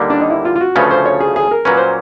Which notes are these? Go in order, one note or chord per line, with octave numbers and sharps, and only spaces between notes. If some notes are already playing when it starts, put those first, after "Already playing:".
Already playing: D#2 D3 G3 A#3
D4
D#4
E4
F4
F4
F#4
D2 C#3 F3 A3 C#4 B4
C5
C#5
G#4
G#4
A#4
A#2 F#3 A#3 C#4 B4
C5